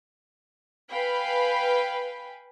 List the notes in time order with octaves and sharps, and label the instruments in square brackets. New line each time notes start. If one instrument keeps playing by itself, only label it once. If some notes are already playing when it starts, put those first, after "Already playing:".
[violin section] B4 F5 G5 G#5 B5